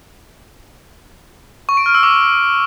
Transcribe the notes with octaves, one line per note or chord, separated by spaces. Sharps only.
C#6
D7
F6
E6
D6